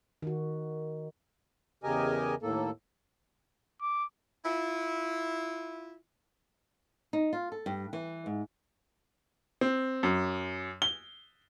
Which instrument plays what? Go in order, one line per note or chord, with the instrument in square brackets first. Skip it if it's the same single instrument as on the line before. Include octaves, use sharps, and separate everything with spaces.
[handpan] D#3 F#4
[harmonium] E2 C#3 G4 A#4 D#5 G#5
D#2 A2 A#3 A4
[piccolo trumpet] D6
[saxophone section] E4 F4
[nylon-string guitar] D#4
F4
A4
G2
E3
G#2
[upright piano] C4
F#2
G7